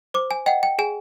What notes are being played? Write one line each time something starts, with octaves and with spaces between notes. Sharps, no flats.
C5 D6
G#5
D#5 F#5 G5
G5
G#4 G#5